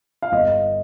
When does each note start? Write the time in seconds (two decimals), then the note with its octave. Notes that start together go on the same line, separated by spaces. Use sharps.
0.22 F5
0.32 G1 D#5